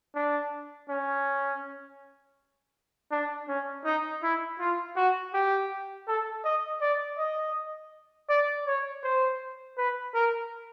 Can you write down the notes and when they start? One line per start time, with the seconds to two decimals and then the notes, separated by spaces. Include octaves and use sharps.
0.15 D4
0.89 C#4
3.11 D4
3.48 C#4
3.85 D#4
4.23 E4
4.59 F4
4.96 F#4
5.33 G4
6.07 A4
6.44 D#5
6.81 D5
7.18 D#5
8.29 D5
8.67 C#5
9.03 C5
9.77 B4
10.14 A#4